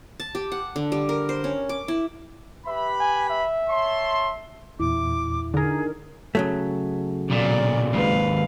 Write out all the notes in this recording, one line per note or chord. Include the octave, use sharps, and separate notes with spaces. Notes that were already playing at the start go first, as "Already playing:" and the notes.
A5
G4
F#5
D3
G3
A#4
C5
C#4
D6
E4
G4 B4 E5 B5
G#5
E5
C#5 A5 C6
E2 A#2 E4 D6
D3 D#4 G#4 A#4
C#3 F#3 A3
B1 A#2 D5
D#2 G#2 B4 F5